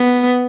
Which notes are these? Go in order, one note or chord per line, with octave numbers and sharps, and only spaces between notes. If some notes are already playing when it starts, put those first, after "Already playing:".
Already playing: B3